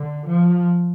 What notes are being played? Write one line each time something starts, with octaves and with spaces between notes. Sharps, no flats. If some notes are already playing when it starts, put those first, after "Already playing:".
Already playing: D3
F3